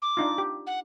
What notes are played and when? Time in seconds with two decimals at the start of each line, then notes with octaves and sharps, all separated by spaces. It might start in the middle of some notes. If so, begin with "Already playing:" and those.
0.02 D6
0.17 D4 D#4 F4
0.38 G4
0.67 F#5